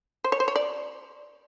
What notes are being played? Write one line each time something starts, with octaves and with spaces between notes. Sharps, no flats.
C5
C#5
C5
C#5
D5